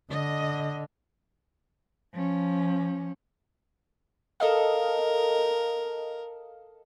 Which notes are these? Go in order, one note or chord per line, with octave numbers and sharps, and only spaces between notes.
D3 D#5
F3 C#4
A4 A#4 D#5 F5